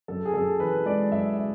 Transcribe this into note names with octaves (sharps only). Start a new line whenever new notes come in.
F#2 A4
G#4
F#2 A4
E3 B4
G#3 D5
F#2 E5
E5